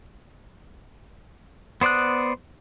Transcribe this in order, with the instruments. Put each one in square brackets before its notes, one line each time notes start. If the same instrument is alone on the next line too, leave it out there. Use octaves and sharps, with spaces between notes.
[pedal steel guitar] B3 C5 D5 D#6 F#6